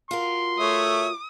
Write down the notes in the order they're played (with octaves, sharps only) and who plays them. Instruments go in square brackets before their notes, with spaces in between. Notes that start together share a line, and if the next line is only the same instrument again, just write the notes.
[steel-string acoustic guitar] F4 F#4 A#4 [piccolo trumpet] C6
[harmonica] A3 C#5 E5 [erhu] D#6